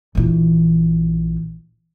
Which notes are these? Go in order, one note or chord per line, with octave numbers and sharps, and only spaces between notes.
A#1 E3